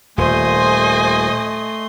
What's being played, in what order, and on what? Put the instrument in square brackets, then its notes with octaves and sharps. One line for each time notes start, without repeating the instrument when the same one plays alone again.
[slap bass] D#1 [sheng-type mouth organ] A3 C6 [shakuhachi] C5 [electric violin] D#5 G#5